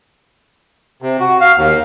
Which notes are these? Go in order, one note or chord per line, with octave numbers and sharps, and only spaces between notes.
C3
F#4
F5
D#2